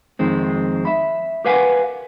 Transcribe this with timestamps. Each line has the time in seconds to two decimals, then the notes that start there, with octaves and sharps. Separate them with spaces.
0.19 F2 D#3 G#3 C4
0.85 E5 B5
1.45 G4 A#4 B4 F5 F#5 G#5